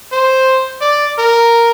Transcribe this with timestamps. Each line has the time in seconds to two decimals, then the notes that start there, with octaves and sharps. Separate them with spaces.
0.13 C5
0.81 D5
1.19 A#4